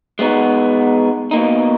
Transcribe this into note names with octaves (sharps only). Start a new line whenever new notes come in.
G#3 B3 D#4 F#4
B2 A#3 D#4